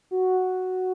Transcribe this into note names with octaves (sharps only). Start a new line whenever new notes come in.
F#4